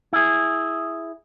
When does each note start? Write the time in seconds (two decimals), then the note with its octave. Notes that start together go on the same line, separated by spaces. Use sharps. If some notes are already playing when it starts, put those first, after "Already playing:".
0.13 E4 G#4